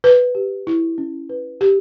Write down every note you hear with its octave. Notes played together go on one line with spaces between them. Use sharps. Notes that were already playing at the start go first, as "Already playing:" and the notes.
B4
G4
E4
C#4
B4
G4